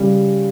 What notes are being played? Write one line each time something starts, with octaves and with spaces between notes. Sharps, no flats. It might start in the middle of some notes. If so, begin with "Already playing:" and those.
Already playing: C#3 G3